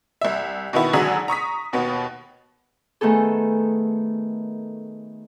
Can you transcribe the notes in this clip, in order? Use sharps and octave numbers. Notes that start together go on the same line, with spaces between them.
C2 E5
B2 D#3 B3 E4
G#1 D3 F#3 G#4 A#5 B6
A#5 C#6 D#6 B6
D#2 B2 B3
D#3 A3 B3 G#4 A4